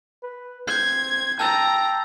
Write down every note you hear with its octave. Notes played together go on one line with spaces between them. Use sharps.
B4
C4 G6 G#6 C7
G5 A5 A#5 E6 A6